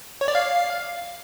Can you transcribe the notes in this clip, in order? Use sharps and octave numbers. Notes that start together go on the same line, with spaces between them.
C#5
D5
F5